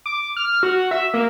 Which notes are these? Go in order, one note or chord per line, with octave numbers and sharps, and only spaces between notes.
D6
F6
F#4
E5
A#3